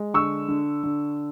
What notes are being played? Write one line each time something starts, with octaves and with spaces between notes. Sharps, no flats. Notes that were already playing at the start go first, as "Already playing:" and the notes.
Already playing: G#3
D3 C#6 E6
D3
D3